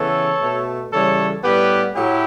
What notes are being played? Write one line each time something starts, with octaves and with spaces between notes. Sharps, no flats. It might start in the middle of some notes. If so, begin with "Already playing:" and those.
Already playing: C#3 E3 B3 A4 C#5
B2 A3
C#3 E3 G3 A4 C#5
A2 G3 B3 G4 B4
A2 F#3 E4 G4